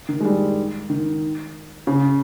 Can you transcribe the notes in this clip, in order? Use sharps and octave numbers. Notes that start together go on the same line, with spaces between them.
D#3
G#3
G3
D#3
C#3